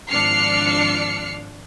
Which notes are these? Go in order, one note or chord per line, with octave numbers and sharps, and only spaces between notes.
G#1 F3 D4 F6 C7 C#7